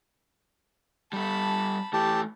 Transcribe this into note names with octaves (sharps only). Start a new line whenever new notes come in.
G3 A4 A5 B5
E3 A3 G4 A5